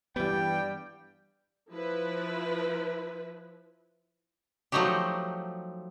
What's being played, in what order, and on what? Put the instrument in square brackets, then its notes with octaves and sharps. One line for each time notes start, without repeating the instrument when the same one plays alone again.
[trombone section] G2 G3 [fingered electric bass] E3 B3 [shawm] G5
[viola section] F3 E4 B4
[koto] F3 F#3 A3 D#4 F#4 G4